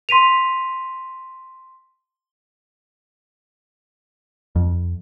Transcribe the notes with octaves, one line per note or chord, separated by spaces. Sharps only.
C6 B6 D#7 F7
F2